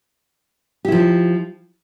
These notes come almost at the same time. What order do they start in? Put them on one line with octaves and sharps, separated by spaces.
G4 E4 F3